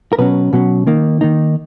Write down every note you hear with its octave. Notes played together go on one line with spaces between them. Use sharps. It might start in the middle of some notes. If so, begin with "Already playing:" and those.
A#4
B2 F#3 C#4 B4
B2 F#3 C#4
D#3 A#3 D#4
D#3 A#3 D#4